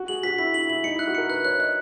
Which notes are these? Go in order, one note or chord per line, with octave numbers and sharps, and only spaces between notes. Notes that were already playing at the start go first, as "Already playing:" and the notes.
Already playing: F#4
G#4 F#7
F#4 B6
E4 B6
E4 F#7
E4 F#7
D#4 C#7
E4 F#6
F#4
A#4 C#7
B4 F#6
C#5 F#6
D#5 F#6